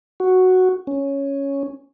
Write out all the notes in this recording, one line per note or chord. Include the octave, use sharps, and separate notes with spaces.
F#4
C#4